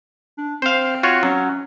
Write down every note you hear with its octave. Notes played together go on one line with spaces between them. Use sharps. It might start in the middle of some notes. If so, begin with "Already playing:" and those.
D4
C4 C5 F5
F4 F#4 C#5
F#3 C#4